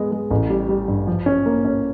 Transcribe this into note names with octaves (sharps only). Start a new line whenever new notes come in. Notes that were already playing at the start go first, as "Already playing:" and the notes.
Already playing: G#3 B3
G#3
A1
G3
G3
G2
F3
C#4
A#3
C#4